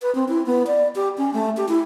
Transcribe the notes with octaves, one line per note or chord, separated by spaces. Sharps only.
B4
C4
E4
B3
D5
G4
C#4
A3
G4
E4